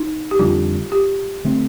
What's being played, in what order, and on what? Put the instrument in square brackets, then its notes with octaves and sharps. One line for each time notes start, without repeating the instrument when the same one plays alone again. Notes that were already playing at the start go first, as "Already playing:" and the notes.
Already playing: [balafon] D#4
G4
[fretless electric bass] F2 D3 G3 D4 [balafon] F4
[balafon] G4
[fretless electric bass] D3 A3 C4